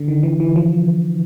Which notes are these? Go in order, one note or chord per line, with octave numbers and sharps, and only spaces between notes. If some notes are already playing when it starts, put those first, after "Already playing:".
Already playing: D3
D#3
E3
E3
F3